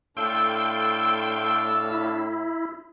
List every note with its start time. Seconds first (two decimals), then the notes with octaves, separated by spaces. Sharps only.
0.17 A2 D4 A4 F5 G5 C6 E6
1.91 E4